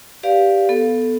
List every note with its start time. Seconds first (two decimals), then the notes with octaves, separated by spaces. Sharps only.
0.23 G4 B4 D5 F5
0.69 B3 A4